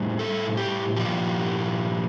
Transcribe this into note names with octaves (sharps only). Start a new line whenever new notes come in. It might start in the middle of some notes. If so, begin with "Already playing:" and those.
Already playing: A2 G3
A4
G4
A#2 F3 G4